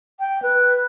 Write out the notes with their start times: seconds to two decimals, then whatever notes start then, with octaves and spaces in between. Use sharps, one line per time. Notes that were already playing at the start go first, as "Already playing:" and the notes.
0.20 G5
0.42 B4